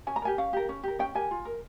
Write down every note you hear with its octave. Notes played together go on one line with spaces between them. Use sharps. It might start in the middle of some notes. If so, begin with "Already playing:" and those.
C#4 G#5
A#5
G4 A#4 G#5
C#4 F5
G4 A#4
C#4
G4 A#4
C#4 G5
G4 A#4 G#5
F4
A#4